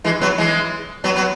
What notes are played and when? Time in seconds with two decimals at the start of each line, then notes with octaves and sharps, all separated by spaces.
0.04 E3 G#3
0.21 F#3 B3
0.38 E3 G#3
1.04 F#3 B3
1.16 F#3 B3